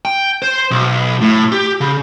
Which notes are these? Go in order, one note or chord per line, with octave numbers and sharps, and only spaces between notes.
G5
C5
B1
A2
G4
C#3